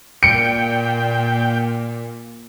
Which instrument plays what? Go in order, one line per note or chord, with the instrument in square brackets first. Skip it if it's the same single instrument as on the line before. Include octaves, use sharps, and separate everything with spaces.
[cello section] A#2 [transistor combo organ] G5 [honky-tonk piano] C#7 D7